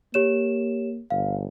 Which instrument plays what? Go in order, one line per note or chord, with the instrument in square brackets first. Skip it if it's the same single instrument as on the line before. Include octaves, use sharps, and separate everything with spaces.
[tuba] A#3 [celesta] G4 C#5 E7
[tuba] G1 [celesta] F5